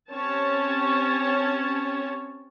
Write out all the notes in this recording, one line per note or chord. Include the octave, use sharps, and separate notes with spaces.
C4 C#4 G4 C#5 A5